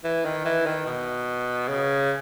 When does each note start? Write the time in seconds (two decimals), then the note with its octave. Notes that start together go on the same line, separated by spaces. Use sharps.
0.04 E3
0.25 D#3
0.45 E3
0.66 D#3
0.86 B2
1.68 C#3